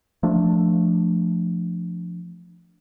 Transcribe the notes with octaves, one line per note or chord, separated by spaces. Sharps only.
F3 A3 D4